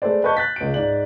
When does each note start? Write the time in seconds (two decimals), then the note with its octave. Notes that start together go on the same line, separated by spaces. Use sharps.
0.02 G#3 A3 A4 B4 C5 D5
0.24 B4 D#5 A5 C#6 G6
0.37 F#6 A6 B6
0.56 C#2 D7
0.74 G#2 D5 F#7